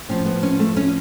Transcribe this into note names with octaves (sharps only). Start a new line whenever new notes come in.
A2 F3 C#4
B3
C#4
A3
C#4